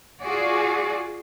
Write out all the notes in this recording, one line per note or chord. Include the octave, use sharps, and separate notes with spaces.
F4 F#4 G#4 D5